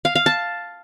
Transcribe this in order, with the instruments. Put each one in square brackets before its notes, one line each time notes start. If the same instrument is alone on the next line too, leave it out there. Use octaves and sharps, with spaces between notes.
[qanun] F5
F5
A5